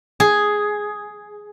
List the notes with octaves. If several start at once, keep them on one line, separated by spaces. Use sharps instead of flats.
G#4